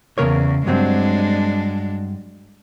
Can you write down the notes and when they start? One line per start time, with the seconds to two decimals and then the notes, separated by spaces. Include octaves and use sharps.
0.18 E2 C#3 A#4 C#5
0.66 G2 F#3 G#3 C4 D4